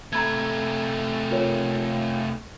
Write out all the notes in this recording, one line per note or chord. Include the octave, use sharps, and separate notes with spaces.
C3 A3 A#5 B5 G#6
F4 A#4 C#5